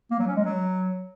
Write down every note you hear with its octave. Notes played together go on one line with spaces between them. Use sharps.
A#3
F#3
C#4
G#3
F#3